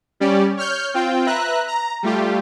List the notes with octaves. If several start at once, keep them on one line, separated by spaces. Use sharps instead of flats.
G3 C#4 G4 D5
C#5 F6 G6
C4 F4 G5
B4 E5 A#5 F#6
A#5
G3 A3 F4 G4